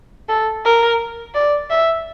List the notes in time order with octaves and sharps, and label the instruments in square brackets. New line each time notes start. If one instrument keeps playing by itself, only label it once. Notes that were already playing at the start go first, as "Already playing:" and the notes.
[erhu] A4
A#4
D5
E5